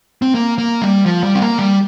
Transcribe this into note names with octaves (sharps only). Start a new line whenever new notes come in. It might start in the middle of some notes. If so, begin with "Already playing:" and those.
C4
A#3
A#3
G3
F3
G3
C4
A#3
G3